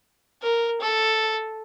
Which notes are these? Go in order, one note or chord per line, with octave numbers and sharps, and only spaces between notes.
A#4
A4